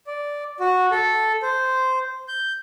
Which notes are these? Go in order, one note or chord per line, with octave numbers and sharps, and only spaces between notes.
D5
F#4
A4
C5
G6